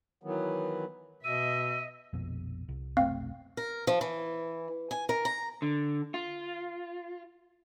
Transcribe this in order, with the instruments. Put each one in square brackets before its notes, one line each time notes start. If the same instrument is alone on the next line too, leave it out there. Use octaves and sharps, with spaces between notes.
[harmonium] D#3 E3 F#3 B3
[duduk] B2 [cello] D#5 E5 [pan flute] E6 [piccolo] D#7
[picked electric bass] A#1 F2 B2
C2
[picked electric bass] F1 B1 A3 [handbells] C4 F5
[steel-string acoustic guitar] A#4
F3
E3
G#5
A#4
A#5
[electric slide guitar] D3
F4